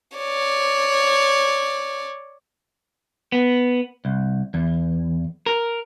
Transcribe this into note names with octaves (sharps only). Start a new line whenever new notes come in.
C#5 D5
B3
C2
E2
A#4